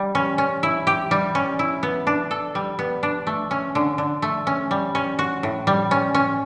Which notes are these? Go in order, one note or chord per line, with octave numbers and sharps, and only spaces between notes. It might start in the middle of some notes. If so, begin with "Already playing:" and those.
Already playing: G3
C#4
C#4
E4
G4
G3
C#4
E4
B3
D4
A4
G3
B3
D4
A3
C#4
D3
D3
A3
C#4
G3
C#4
F#4
A2
G3
C#4
C#4